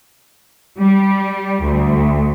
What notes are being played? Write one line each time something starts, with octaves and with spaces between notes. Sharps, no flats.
G3
D2